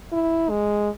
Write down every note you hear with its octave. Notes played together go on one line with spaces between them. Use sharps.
E4
G#3